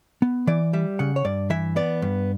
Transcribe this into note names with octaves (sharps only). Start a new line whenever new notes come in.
B3
E3 D5
G3 E5
C#3 F#5
C#5
G2 D5
E3 E5
B3 D5
G2